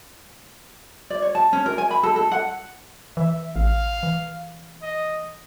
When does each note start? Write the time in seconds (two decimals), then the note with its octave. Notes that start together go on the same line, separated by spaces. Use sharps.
1.10 D5
1.22 C#5
1.35 A5
1.53 C#4
1.66 A#4
1.78 G#5
1.91 B5
2.03 A4
2.16 A4
2.32 F#5
3.17 E3 E5
3.56 A1 F5
4.03 E3
4.82 D#5